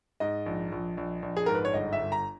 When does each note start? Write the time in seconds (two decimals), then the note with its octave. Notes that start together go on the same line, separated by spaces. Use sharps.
0.20 G#2 D#5
0.46 A#1
0.72 A#1
0.97 A#1
1.22 A#1
1.37 G#4
1.46 G#2 A#4
1.55 B4
1.65 C#5
1.73 G1 D#5
1.93 E5
1.99 G1
2.12 A#5